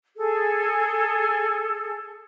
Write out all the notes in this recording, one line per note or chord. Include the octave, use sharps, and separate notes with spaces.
G#4 A4